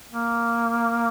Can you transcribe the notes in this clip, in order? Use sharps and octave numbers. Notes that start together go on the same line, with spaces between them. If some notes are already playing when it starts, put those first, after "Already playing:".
A#3